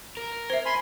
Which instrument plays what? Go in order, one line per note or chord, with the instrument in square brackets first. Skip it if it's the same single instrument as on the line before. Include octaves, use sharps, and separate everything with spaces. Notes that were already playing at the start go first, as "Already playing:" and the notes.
[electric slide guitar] A#4
[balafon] C5 E5
[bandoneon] G#5 B5 C6